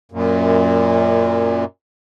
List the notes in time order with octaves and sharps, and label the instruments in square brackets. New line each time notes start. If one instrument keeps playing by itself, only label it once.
[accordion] F#2 A#2